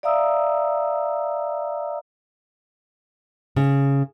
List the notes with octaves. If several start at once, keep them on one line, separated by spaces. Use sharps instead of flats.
D5 E5 F5 A#5 D#6 E6
C#3